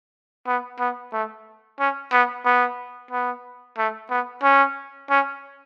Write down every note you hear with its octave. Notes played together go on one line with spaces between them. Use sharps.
B3
B3
A3
C#4
B3
B3
B3
A3
B3
C#4
C#4